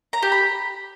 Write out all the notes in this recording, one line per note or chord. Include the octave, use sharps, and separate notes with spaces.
A#5
G4
B5